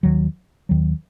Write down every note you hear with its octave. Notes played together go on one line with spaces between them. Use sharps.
D#2 D#3 F#3
D#2 D#3 F#3